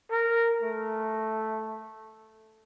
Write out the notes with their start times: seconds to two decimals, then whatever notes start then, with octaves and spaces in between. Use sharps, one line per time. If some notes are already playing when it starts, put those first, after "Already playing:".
0.11 A#4
0.62 A3